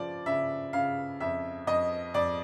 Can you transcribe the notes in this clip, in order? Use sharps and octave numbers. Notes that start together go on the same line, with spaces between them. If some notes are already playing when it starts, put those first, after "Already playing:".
Already playing: C#3 F3 D5
C#3 E5
C#3 F5
F2 E5
F2 D#5
F2 D5